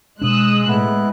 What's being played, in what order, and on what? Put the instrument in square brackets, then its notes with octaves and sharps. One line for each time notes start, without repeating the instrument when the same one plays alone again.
[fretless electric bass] B2 D4 [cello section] G#3 [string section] D#6 E6 F#6
[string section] A2 [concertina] B3 E4 F#6